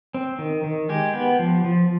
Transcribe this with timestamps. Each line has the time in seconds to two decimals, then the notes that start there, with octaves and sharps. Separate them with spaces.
0.14 C4
0.39 D#3
0.64 D#3
0.89 G#3 G4
1.14 B3
1.39 F3
1.64 F3